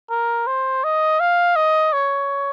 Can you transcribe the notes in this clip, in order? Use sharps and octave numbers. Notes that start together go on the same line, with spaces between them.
A#4
C5
D#5
F5
D#5
C#5